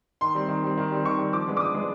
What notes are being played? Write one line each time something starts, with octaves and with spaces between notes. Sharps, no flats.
D#3 C6
G3 C4
D#3
G3 C4
D#3
G3 C4
D#3 C#6
G3
C4
F3 D6
G#3 B3 D4
D6
F3 D#6
G#3 B3 D4